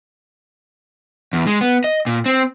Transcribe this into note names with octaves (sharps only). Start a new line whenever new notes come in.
E2
G#3
B3
D#5
A#2
C4